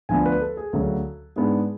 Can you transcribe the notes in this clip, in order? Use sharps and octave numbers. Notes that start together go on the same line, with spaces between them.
D2 D3 F3 B3 D4 G#5
B4
A4
G#4
D2 C#3 F#3 A4
G#2 G#3 B3 D4 G#4